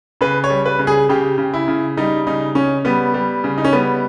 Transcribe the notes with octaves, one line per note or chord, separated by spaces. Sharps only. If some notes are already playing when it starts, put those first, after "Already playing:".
C#3 B4
C#5
G3
B4
C#3
G#4
C#3 G4
C#3
E4
C#3
G3 D#4
C#3 D#4
C#3 C#4
G3 B3
G3
C#3
D#4
C#4
G3 B3